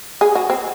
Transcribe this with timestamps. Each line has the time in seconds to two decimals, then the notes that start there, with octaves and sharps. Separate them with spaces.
0.21 G#4
0.35 F#4
0.50 C4